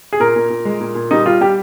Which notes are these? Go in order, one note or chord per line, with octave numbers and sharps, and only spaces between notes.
G#4
A#2 A#4
A#2
A#2
G#3
A#2
A#2
G3 D#4
G3 F4
G3 G4